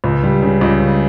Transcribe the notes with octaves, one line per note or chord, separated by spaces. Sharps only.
C#2
G3
C#3
C#2
C#3